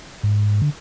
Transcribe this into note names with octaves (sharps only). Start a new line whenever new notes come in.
G#2
D3